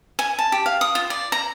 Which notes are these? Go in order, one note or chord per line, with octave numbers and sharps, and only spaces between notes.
G#5
A5
G4
F5
D#6
F4
D5
A#5